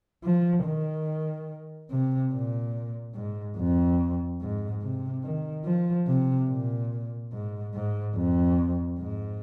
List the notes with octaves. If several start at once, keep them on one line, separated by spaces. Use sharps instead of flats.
F3
D#3
C3
A#2
G#2
F2
G#2
C3
D#3
F3
C3
A#2
G#2
G#2
F2
G#2